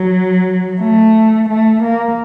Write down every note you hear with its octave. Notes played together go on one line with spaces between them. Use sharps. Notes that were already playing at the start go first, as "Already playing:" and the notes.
Already playing: F#3
A3
A3
A#3